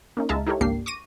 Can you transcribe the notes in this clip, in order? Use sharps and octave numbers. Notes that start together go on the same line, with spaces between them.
A#3 C#4 D#4
C#2 G#3 E5 F5 A5 A#5
D#4 E4 G4 A4 A#4 C#5
G#1 C#2 A#3 D4 G4 C7
C#6 D6 A#6 D#7